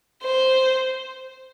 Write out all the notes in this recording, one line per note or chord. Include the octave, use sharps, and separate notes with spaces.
C5